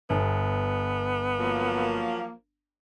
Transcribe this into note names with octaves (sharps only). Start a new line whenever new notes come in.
G1 B3
F3 F#3 A#3